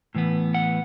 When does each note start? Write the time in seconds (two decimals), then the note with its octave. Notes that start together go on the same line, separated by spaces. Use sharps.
0.15 A2 E3 B3
0.54 F#5